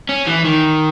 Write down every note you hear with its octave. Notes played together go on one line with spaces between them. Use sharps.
C#4
E3
D#3